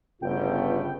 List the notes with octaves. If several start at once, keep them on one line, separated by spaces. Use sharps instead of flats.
G1 C#3 A3 B3 F4 G5